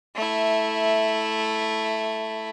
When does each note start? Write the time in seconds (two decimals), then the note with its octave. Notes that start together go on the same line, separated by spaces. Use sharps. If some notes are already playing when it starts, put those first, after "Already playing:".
0.16 A3 E4